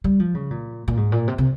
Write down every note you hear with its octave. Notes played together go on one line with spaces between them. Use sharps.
G3
F3
C#3
A#2
A#2
G#2
A#2
C3
C3